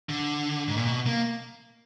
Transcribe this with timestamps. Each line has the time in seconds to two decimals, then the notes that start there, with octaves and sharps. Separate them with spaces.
0.09 D3
0.68 G#2
0.77 A#2
0.85 B2
1.06 A#3